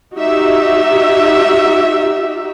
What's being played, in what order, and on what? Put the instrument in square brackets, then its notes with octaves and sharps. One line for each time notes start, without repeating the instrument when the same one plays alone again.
[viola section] D#4 F#4 G4 E5